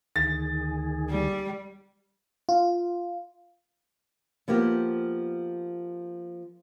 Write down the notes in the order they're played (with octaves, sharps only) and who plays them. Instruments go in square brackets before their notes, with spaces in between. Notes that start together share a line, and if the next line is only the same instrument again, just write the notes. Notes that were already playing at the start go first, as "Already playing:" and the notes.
[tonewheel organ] D2 D#3 G#4 [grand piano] A6
[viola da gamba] G3
[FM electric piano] F4
[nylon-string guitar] F3 A#3 B3 G4